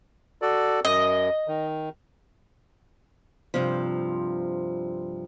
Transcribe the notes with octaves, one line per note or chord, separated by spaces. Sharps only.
F#4 A4 D5
F#2 D#5
D#3
G2 C3 F3